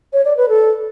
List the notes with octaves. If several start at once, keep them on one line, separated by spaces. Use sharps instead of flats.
C#5
D5
B4
A4